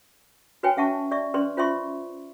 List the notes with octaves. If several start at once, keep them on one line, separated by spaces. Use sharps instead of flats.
F#4 B4 C#5 G5 G#5
C#4 E5 F#5 A5 C#6
D5 E5 C#6
C#4 B4 D5 C6
F4 C5 E5 C6 C#6